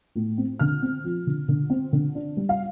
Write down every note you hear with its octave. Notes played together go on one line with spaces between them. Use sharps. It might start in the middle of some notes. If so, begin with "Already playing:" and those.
A2
C4
D3 F6
C4
F3
D3
D3
C4
D3
D4
G3
F5